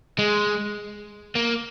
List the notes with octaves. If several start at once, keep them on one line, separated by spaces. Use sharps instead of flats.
G#3
A#3